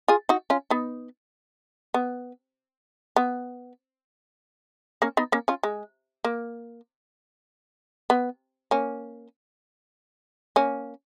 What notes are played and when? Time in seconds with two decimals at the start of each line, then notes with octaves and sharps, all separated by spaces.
0.08 F4 G#4
0.29 D#4 F#4
0.50 C#4 F4
0.70 B3 D#4
1.94 B3
3.16 B3
5.02 A#3 C#4
5.17 B3 D#4
5.32 A#3 C#4
5.48 C#4 F4
5.63 G#3
6.24 A#3
8.10 B3
8.71 A#3 C#4
10.56 A#3 C#4